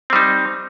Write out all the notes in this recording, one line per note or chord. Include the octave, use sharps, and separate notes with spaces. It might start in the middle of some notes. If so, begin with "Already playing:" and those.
G3 C4 D#4